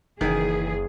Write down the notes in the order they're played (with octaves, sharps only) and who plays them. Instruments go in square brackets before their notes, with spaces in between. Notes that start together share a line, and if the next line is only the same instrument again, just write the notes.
[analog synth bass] F#1 [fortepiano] D#3 [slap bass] E3 [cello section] G#4